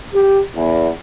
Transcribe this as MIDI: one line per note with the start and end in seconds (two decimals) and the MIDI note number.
0.14 0.40 67
0.55 0.89 40